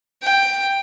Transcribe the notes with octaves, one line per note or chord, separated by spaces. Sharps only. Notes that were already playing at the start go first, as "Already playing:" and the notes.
G5